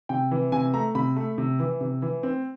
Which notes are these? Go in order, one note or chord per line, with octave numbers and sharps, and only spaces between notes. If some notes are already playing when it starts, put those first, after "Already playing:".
C3 G5
E3
C3 G#5
A3 A#5
C3 B5
A3
C3
E3
C3
E3
C4